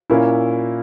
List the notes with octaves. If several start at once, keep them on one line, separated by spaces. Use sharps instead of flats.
A#2 A#3 C#4 E4